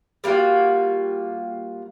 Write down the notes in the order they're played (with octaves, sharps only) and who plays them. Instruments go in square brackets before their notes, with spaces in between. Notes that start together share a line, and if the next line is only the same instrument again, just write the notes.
[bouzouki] G3 A#3 F4 F#4